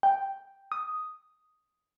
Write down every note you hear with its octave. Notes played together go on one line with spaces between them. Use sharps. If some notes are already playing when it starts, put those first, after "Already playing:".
G5
D#6